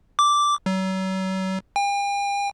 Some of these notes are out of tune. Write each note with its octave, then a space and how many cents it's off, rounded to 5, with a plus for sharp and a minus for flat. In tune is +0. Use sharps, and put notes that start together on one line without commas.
D6 -5
F#3 +40
G5 +45